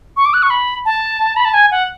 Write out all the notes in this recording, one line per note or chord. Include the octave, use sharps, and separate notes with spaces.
C#6
D6
F#6
C#6
B5
A5
B5
A5
G#5
F#5